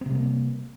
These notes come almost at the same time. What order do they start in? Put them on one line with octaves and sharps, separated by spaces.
C4 C3 G3 A#3